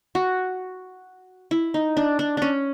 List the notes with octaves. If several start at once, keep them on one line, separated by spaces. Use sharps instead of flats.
F#4
E4
D#4
D4
D4
C#4 D4